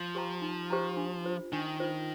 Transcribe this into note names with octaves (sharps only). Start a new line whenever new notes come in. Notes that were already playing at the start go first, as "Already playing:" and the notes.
Already playing: F3
G4 C5 G5 A#5
D#4
G4 C5 G5 A#5
D4
F4 C5
D#3 D4
F4 C5